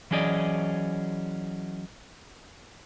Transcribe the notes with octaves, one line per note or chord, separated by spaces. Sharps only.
E3 F#3 C#4 G#4 D5 D#5